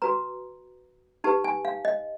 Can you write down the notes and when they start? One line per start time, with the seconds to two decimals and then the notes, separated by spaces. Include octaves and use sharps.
0.02 F#4 B4 A#5
1.24 D#4 G4 B4 A5
1.44 G#5
1.65 F5
1.85 D#5